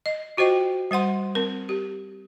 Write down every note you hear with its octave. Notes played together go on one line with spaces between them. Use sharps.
D#5
F4 F#4 C5 D#5 G5
G3 C5 F#5 C6
C4 A#4
G4